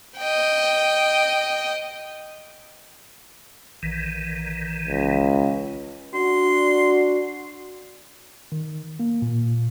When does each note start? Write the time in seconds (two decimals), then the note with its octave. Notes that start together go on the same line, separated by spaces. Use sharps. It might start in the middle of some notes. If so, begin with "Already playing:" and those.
0.17 D#5 G5
3.83 A#1 D#3 E3
4.88 C#2
6.14 D4 F#4 C6
8.52 D#3
9.00 A#3
9.22 A#2